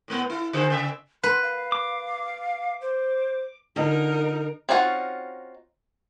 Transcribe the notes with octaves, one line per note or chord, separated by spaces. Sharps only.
A2 A3 B3
E4
D3 G#4 C5
C#3 E5
B4 C6
F5
D6
C5
D3 D#4 F4 A#4 D#5
C4 C#4 D#4 F4 F#4